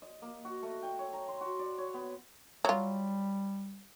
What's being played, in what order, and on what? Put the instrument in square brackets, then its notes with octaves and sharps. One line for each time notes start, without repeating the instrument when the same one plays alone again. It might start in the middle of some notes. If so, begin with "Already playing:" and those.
[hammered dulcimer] D#5
A#3
F#4
A3
G5
C#5
A#5
C6
F#4
D5
C#5
B3
[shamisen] F#3 F4 [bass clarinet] G3